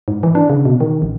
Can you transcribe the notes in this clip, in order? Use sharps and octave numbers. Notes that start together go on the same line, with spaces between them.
G#2
E3
D4
C#3
B2
D#3
A1